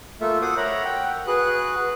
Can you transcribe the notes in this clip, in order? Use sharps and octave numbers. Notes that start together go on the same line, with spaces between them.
A3 A#3 F4 A4 E5
F#4 A4 C5 F#5 D6 D#6
A#4 C#5 E5 F#5 A#5 B5
F#5 G5
F#4 G#4 B4 F#6